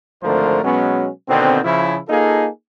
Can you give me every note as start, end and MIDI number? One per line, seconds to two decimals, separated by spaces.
0.23 0.63 32
0.23 0.63 50
0.23 0.63 53
0.23 0.63 57
0.23 0.63 70
0.23 0.63 72
0.64 1.09 47
0.64 1.09 54
0.64 1.09 56
0.64 1.09 59
0.64 1.09 61
1.28 1.59 47
1.28 1.59 50
1.28 1.59 51
1.28 1.59 60
1.65 1.98 49
1.65 1.98 53
1.65 1.98 64
2.09 2.48 58
2.09 2.48 63
2.09 2.48 65
2.09 2.48 68
2.09 2.48 69